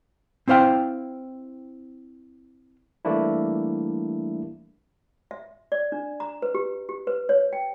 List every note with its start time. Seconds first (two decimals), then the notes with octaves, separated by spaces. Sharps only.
0.48 C4 E4 C5 F5 G5
3.05 E3 G3 A3 A#3 D4 E4
5.31 E5
5.72 D5
5.92 D4
6.20 A#5
6.42 B4
6.55 G4
6.89 G4
7.07 B4
7.29 C#5
7.53 G5